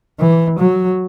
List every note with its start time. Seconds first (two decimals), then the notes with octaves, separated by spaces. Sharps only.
0.20 E3
0.60 F#3